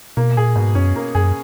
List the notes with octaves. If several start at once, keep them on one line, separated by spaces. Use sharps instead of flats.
B2 A#3
A#2 G#4
G#2 B2
F#2 C#4
A#3
F#2 G#4